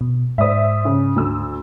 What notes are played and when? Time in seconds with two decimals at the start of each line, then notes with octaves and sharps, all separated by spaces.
0.01 B2
0.38 G#2 C5 D5 E5 D#6
0.85 C#3
1.16 D2 E6